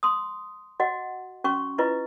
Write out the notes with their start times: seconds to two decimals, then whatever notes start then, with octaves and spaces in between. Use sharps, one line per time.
0.03 C6 D#6
0.80 F#4 D#5 F#5
1.44 C#4 F#4 C#6
1.78 E4 F4 B4 D#5